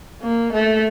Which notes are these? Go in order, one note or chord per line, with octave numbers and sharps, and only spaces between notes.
A#3
A3